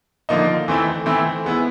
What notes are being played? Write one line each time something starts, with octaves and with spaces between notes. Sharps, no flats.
D3 F3 A#3 D#4
E3 A3 C4 E4
E3 A3 C4 E4
G#3 B3 E4